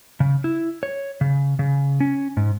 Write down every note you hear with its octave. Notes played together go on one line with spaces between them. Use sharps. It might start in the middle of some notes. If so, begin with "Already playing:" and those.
C#3
E4
C#5
C#3
C#3
C#4
G#2